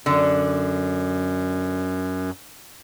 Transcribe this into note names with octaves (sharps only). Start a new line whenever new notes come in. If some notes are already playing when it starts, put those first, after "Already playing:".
F#2 D3